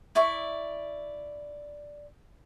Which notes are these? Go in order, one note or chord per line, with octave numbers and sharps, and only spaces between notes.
E4 D5 E5 C#6